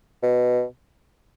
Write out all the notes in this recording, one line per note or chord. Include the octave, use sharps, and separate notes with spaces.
B2